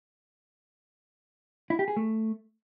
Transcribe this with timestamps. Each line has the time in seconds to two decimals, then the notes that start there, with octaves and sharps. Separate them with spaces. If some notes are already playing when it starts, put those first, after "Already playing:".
1.70 E4
1.79 G4
1.88 G#4
1.97 A3